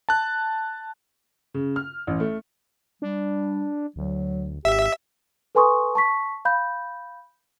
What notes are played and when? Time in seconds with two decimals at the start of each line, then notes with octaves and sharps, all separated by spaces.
0.09 A5 F#6
1.54 C#3
1.76 F6
2.07 A1
2.20 A3
3.02 G3 D4
3.96 D2 F#3
4.65 G#1 G4 E5
5.55 A4 B4 G#5 C6 C#6 D#6
5.95 A5 C#6 B6
6.45 F5 B5 G6